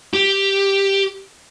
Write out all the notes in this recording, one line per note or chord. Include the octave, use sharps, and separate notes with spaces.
G4